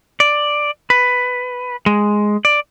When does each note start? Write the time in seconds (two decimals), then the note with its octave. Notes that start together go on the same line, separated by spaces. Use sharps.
0.20 D5
0.90 B4
1.86 G#3
2.45 D5